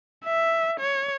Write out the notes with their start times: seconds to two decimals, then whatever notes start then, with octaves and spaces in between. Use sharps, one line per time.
0.24 E5
0.80 C#5